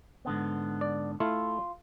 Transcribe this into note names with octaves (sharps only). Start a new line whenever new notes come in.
G#2 D3 B3
D5
A3 E4 F4